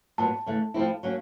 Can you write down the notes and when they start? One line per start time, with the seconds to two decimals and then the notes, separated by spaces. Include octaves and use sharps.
0.18 A#2 F#3 B3 A5
0.46 C#3 E3 A3
0.74 F3 A3 C4 E4
1.03 F#3 A#3 C#4